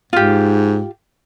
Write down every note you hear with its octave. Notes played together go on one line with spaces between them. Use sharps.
G#2 F4 G4